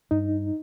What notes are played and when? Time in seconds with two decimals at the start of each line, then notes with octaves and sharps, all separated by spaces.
0.11 G2 D#4